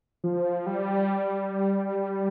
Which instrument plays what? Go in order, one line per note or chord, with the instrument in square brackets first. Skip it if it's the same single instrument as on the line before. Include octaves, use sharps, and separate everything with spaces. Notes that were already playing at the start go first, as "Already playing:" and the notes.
[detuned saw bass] F3
G3